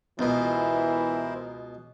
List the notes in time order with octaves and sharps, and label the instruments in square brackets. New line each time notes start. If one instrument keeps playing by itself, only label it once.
[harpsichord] C#2 B2 [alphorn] E3 [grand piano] B3 [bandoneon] E4 A#4 C5